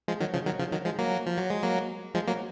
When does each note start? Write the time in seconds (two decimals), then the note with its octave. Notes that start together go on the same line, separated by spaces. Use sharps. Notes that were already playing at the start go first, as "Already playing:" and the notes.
0.08 F3 G#3
0.20 D#3 F#3
0.33 C#3 F3
0.46 D#3 F#3
0.59 C#3 F3
0.72 D#3 F#3
0.85 F3 G#3
0.98 F#3 A#3
1.26 F3
1.38 F#3
1.50 G#3
1.63 F#3 A#3
2.14 F3 G#3
2.27 F#3 A#3